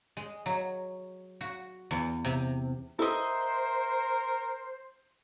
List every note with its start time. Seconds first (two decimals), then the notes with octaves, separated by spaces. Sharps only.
0.17 G#3
0.46 F#3
1.41 F#4
1.91 E2
2.25 C3
2.99 E4 A4 A#4 C5 D#5 E5